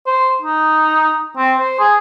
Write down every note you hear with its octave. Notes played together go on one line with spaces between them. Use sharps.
C5
D#4
C4
C5
G#4